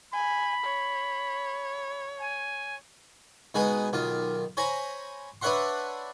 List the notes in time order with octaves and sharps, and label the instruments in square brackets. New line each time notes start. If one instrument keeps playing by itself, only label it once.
[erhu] G#5 [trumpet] B5
[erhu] C#5
[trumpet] G#5
[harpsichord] B2 G#3 D#4 G#4 B4
B1 D#3 F4
C5 C#5 G#5 A#5 B5
D4 B4 C#5 E5 F#5 C6